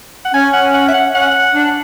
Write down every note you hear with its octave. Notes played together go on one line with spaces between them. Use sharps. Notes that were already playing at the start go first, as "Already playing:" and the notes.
F#5
C#4 G#5
F#5
F#5
E5
F#5
C#4 F#5
D4